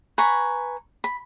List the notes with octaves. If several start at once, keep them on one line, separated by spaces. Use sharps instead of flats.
B4 G#5 A#5 C#6
B5